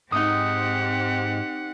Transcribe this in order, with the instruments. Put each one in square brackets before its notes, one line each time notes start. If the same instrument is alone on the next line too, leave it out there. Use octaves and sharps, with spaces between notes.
[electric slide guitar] G#2 [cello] C4 G4 [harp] D#4 D#6 [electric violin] F#5